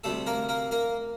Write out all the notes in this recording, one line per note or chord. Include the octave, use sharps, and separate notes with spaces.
D2 C3 G3 A3 A4
A#3 A#4
A#3 A#4
A#3 A#4